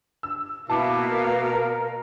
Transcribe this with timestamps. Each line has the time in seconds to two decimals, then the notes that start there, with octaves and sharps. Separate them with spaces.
0.23 E6
0.70 B2 A#3 E4 F5 A5 D6
1.10 A#4